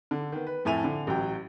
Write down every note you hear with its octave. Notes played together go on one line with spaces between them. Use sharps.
D3
D#3 B3
B4
F2 A2 E5 G#5 D#7 F7
D3
A1 F#3 G5